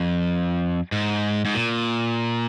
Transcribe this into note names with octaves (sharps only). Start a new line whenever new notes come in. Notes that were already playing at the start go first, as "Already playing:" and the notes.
Already playing: F2
G#2
G#2
A#2